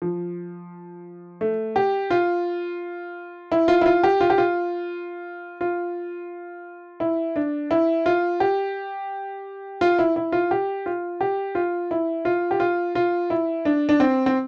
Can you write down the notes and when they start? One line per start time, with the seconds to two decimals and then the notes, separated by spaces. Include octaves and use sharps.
0.02 F3
1.41 A3
1.76 G4
2.10 F4
3.52 E4
3.68 F4
3.81 E4
3.86 F4
4.04 G4
4.20 F4
4.30 G4
4.38 F4
5.61 F4
7.00 E4
7.36 D4
7.71 E4
8.06 F4
8.40 G4
9.81 F4
9.99 E4
10.16 E4
10.32 F4
10.51 G4
10.86 F4
11.21 G4
11.55 F4
11.91 E4
12.25 F4
12.51 G4
12.60 F4
12.95 F4
13.30 E4
13.65 D4
13.89 D4
14.00 C4
14.26 C4